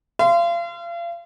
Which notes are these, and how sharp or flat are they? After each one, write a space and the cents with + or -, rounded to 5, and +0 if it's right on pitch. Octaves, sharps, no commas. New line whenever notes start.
F5 -35 C6 -20